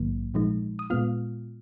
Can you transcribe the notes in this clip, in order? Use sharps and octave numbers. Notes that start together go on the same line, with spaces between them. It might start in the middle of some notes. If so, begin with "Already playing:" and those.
Already playing: A#1 G#2 D#3 F#3 A#3
A#2 F3 G#3 D#4
D#6
A#2 G#3 B3 F4 F6